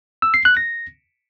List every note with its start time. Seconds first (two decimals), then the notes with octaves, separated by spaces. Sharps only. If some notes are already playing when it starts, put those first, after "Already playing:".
0.22 E6
0.34 C7
0.45 F#6
0.57 A#6